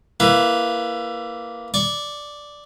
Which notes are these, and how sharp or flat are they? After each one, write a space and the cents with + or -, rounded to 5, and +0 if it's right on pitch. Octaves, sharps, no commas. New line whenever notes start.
A#3 +0 E4 +25 B4 +0
D5 +0 C#6 +0